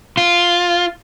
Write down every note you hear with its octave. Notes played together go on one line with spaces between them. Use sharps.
F4